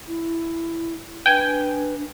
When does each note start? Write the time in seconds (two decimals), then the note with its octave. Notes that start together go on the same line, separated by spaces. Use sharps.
0.08 E4
1.26 D4 B4 G5 G#5